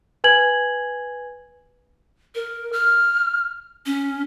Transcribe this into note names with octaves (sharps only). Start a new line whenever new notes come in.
B4 G#5 G#6 F#7
A#4
F6
C#4